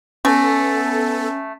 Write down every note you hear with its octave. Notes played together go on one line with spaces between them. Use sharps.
A3 B3 C#4 A4